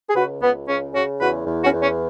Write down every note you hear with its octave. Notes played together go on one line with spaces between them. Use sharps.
G#4
C#2 F#4 B4
C#2 B3
C#3 C#4
C#3 C#4 F#4
E2 F#4 B4
E2
C#4 F#4
E2
C#4